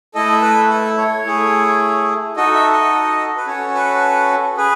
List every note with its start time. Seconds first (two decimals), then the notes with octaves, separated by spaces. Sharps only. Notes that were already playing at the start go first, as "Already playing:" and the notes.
0.15 A3 E4 A4 D#5
0.42 B4
0.70 A4
0.97 C#5
1.25 A3 E4 G#4
2.36 D#4 F#4 A4 D#5
2.54 E5
2.73 D#5
3.37 B4
3.47 C#4 F#4 A4 C#5
3.75 B4
4.57 G#4 B4